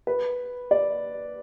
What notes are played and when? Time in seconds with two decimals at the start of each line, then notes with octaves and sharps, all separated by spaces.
0.07 B4
0.71 D5